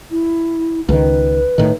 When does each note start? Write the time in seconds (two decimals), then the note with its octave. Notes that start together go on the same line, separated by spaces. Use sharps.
0.11 E4
0.89 C#2 D#3 B4
1.58 A2 D#3